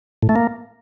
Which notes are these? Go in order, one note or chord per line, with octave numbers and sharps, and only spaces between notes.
A2
A3
A#3